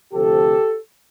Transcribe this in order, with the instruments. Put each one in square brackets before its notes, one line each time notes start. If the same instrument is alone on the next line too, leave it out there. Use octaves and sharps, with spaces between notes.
[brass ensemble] D2 C3 F3 G4 A4